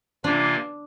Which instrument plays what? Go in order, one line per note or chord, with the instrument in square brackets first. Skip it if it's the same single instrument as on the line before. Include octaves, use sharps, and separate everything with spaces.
[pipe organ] C3 E3 A#3 F4 [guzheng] D4